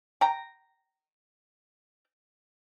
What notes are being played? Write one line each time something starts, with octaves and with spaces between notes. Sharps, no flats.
G5 A#5